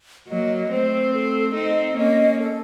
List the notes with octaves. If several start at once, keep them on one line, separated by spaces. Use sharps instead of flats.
F#3 A#3 D#5
A3 C4 C5
A4
C4 D#4 D#5
A#3 C#4 D#5
A4